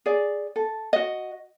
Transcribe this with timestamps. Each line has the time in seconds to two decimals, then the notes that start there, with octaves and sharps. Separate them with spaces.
0.06 G#4 D5
0.56 A4
0.93 F#4 D#5